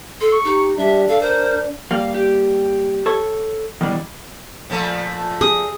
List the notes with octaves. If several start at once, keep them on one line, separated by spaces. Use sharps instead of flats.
A4 C6
C#6
D#4 G4
G3 D4 E5
A4 F5
A#4 C5
G3 A#3 F5
G4
A4 C#5
B2 D#3 E3 G3
A#2 F3 A3
G#4 D#6